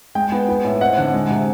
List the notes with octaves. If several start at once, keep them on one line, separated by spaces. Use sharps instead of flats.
G#3 G5
B3
B3
A2
C4 F#5
D3 F#5
G#3
C3